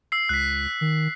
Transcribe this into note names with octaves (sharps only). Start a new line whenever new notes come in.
E6 C7
C#2 F#6 B6
D#3